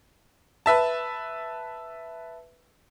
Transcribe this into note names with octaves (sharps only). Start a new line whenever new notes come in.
B4 E5 A5